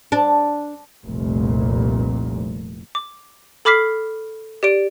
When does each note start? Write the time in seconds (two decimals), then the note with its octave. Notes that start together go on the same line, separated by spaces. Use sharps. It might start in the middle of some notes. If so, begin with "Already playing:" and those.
0.12 D4
1.06 F1 C2 A#2
2.95 D6
3.65 A4 B5 D6 F6 B6 C7
4.63 G4 D5 D7